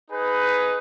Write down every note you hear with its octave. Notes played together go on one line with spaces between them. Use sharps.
D#4 G#4 B4